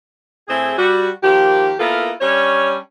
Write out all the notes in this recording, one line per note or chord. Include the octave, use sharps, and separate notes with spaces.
A2 C4 E4 G#4
G3 F#4
D#3 F3 A#3 G4
A#3 B3 E4 F4 A4 A#4
G3 C#4 D4 C#5